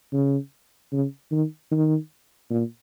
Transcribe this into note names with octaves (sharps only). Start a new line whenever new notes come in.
C#3
C#3
D#3
D#3
A#2